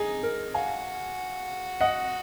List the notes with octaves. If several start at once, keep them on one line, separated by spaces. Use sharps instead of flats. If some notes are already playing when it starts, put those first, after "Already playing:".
Already playing: D#4 G#4
A#4
F#4 F5 G#5
D#5 F#5